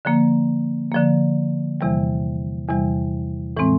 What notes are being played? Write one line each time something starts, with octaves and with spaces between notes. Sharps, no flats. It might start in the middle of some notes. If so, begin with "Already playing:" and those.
D3 F3 A#3
D3 F3 A#3
E2 C3 E3 G3
E2 C3 E3 G3
A2 E3 G#3 C4